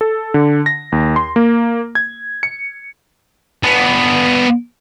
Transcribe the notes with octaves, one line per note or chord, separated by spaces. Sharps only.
A4
D3
A#6
D#2
C6
A#3
G#6
C#7
B3 D4